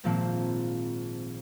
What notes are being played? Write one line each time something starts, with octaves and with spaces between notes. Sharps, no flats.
G#1 A#2 F3 A#3 C4 A5